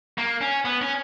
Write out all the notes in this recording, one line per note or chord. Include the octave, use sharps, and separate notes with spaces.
A#3
C#4
B3
C#4